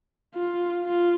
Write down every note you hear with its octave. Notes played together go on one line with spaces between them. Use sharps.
F4
F4